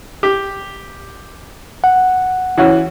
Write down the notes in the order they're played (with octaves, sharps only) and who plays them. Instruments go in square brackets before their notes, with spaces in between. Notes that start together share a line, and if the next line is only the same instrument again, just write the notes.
[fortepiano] G4
[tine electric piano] F#5
[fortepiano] E3 C#4 F#4